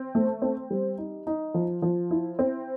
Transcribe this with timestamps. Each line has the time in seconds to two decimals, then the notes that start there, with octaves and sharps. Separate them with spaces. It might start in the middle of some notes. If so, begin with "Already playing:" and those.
Already playing: C4
0.15 A3
0.42 C4
0.70 G3
0.98 D#4
1.27 D#4
1.54 F3
1.82 F3
2.11 E4
2.39 C4